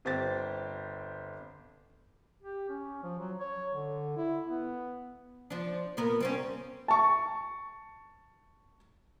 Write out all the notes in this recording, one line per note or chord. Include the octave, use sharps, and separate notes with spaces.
G1 C4 G4 A6
G4
C#4
F3
F#3
C#5
D3
E4
B3
F3 D4
A#2 B3 A#4
G3 C4 C#4
A5 C#6